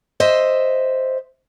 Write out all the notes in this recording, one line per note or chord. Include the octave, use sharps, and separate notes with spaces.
C5 D#5 E5